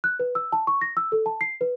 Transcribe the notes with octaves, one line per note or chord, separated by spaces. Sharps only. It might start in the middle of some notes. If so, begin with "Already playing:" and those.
F#6
B4
E6
A5
C#6
A#6
E6
A4
A5
C7
B4